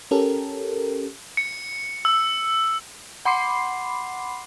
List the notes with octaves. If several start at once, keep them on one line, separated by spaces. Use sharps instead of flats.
C#4 G4 A4 A#4
C#7
E6
F#5 B5 C6 D6 C7